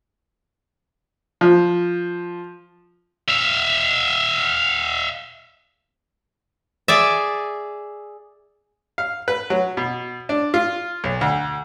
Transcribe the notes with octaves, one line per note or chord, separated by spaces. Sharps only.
F3
E5 F5
G#4 D5 E5
F5
B4
F#3
B2
D4
F4
B1
D2